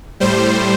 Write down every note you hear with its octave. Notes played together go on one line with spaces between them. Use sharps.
A2 G3 C5